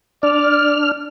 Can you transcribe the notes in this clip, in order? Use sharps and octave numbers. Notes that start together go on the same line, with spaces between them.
D4 D5 F6